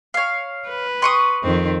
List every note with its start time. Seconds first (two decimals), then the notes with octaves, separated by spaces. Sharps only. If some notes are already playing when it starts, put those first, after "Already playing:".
0.14 C#5 F5
0.68 B4
1.02 C6 C#6 D#6
1.43 F2 D#3 C4